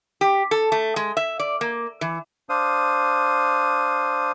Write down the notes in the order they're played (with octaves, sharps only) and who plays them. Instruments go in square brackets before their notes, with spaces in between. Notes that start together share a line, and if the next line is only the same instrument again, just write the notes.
[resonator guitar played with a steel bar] G4
A4
A3
G#3
E5
D5
A#3
E3
[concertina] D4 C5 F5 D#6